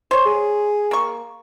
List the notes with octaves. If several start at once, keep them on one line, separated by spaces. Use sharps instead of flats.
C5 C#5
G#4
A#3 C#6